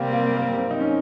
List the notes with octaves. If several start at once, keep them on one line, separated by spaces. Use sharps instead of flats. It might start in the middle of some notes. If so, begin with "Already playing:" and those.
Already playing: C3 G3 A#3 C4
A#3
A#3
C4
D#4
C#4